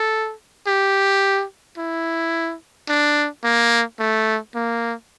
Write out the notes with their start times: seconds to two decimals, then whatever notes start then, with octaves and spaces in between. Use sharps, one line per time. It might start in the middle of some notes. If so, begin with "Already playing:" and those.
Already playing: A4
0.67 G4
1.78 E4
2.89 D4
3.44 A#3
4.00 A3
4.55 A#3